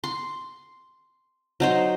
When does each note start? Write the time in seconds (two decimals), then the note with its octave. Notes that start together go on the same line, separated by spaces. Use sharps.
0.04 C6
1.60 F#3 D#4 C5